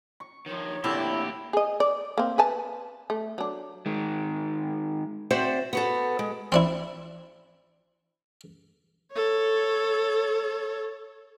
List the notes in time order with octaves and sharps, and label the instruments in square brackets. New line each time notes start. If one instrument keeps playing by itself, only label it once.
[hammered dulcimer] C#6
[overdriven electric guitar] D#3 F3 [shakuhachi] C#5
[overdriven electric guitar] D2 G4 [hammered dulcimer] A#2 D3 C4 [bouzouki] E4
[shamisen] G#4 D#5
D5
A#3 C4
B4 G#5 A5
A3
F#3 D4
[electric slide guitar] D#3 G#3
[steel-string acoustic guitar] C4 F#4 C5 D5 E5
B3 F#4 A4
G#3
[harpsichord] C4 D4 E4
[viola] A4 C#5